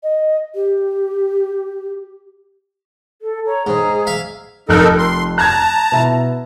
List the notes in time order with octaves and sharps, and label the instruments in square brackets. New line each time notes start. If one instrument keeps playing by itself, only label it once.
[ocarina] D#5
G4
[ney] A4
[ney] C#5 [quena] A#5
[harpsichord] G#2 [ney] G#4
[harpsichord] E5 F5
[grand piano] F1 F2 F#6 [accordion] D#4 A4 A#4
[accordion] C6
[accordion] A5 A#5 [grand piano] F#6 G#6
[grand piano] B2 E4